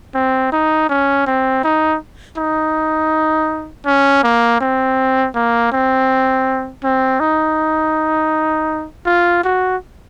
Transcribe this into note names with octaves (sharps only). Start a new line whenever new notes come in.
C4
D#4
C#4
C4
D#4
D#4
C#4
A#3
C4
A#3
C4
C4
D#4
F4
F#4